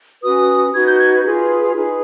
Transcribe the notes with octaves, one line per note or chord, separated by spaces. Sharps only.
C#4 F#4 B4 D#6
D#4 F#4 B4 G#6
G6
G#6
F4 G#4 B4
D#4 G#4 B4